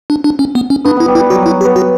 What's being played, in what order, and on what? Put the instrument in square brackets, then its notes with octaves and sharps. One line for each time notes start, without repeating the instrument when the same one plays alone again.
[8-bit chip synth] D4
D4
C#4
B3
C#4
[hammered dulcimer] B3 [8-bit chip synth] D4
[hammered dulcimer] B3 [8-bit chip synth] E4
[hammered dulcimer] G3
[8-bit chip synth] E4
[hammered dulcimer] G3
[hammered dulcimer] F#3 [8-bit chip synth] F#4
[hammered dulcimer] F#3 [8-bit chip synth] E4
[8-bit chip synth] G4
[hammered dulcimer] B3
[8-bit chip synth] F#4